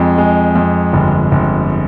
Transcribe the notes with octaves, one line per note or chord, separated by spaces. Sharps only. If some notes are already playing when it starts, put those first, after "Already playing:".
Already playing: F2 G#3
G#3
F2
G1
G1